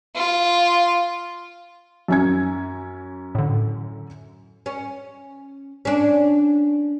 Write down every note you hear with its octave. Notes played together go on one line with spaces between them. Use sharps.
F4
F#2 C#4 G#6
A2 D3
C#4
C#4 D4